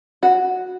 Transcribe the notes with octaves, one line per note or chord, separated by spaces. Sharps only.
F#4